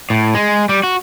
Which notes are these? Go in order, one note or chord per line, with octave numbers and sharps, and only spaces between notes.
A2
G#3
G3
F#4